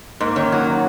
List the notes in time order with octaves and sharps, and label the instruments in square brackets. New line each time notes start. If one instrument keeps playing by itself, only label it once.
[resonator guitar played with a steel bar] G#2 [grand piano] A#3
[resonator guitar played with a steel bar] D#3 [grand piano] C#4
[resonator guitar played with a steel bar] F#3 [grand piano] F#4
[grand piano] D#4
C#4